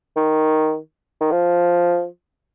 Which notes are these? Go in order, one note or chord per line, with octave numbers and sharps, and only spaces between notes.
D#3
D#3
F3